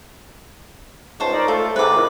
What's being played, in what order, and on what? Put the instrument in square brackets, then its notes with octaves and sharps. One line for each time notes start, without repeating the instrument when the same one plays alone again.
[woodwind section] C#2 G#2 [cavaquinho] C5 A5 C#6
[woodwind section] D#4 A#4 D5
[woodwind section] A3 [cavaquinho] F4
[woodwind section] G#2 C3 [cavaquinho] B4 D6
[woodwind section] F2 A2 D#3